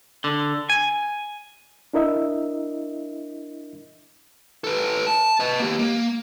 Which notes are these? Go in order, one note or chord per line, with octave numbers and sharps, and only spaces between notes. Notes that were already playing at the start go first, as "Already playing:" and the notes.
D3
G#5
D4 E4 A#4 D#5 E5
A4 B4
A5
B4 D#5
A#3 G4
A#3